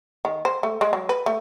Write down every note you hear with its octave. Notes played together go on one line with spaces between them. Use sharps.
D#3
C5
A3
G#3
F#3
B4
A3